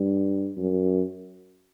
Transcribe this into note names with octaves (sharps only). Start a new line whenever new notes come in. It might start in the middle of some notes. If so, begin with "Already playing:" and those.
Already playing: G2
F#2